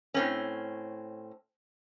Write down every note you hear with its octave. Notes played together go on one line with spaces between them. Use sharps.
A2 C4 C#4